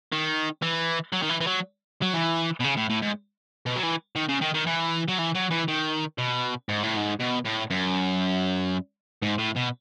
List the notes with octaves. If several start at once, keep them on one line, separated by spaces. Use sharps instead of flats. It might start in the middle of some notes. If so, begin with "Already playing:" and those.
D#3
E3
F#3
D#3
E3
E3
F#3
F#3
E3
B2
C#3
A2
A2
G#2
B2
F#3
E3
D#3
C#3
D#3
D#3
E3
F#3
E3
F#3
E3
D#3
B2
G#2
A2
G#2
B2
A2
F#2
G#2
A2
B2